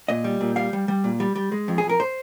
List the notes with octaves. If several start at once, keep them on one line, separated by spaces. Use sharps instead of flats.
A#2 D#5
G3
A#2
G3 F5
G3
G3
A#2
G3
G3
G#3
F2
G#4
F2
A#4
C5